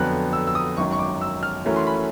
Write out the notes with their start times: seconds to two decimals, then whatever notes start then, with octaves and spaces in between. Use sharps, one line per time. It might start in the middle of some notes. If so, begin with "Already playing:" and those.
Already playing: F2 D3 F#3 B3 F#6
0.33 E6
0.47 E6
0.55 D#6
0.77 G#1 F#2 D#3 F#3 C#6
0.92 C#6
0.99 D6
1.21 E6
1.43 F6
1.65 E3 A3 C#4 F#4 A#4
1.76 C6
1.87 B5